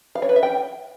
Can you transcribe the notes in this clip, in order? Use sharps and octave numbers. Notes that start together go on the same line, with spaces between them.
F5
C#5
B4
E5
G5